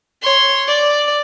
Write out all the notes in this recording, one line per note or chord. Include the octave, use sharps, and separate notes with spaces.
C#5 C6
D5